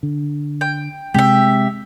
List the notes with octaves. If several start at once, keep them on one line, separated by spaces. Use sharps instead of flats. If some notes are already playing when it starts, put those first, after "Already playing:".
D3
G5
C3 G#3 G4 E5